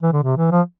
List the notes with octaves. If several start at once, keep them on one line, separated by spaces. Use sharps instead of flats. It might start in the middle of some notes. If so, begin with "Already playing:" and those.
E3
D3
C3
E3
F3